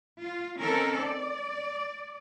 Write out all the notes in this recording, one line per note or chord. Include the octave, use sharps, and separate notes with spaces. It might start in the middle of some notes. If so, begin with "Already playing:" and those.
F4
D#3 C4 C#4 A4 A#4
D5